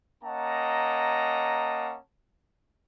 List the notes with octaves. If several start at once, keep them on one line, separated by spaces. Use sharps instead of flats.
A#3 C#4 D#5 F#5 A5 A#5